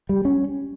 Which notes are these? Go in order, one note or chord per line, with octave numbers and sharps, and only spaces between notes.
G3
C#4